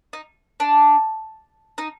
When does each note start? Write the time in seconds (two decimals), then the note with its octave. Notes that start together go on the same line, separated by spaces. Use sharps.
0.13 D#4
0.60 D4
1.78 D#4